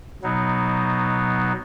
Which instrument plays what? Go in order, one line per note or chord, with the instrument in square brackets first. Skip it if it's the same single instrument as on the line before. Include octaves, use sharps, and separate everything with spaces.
[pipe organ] B2 F#3 B3 D#4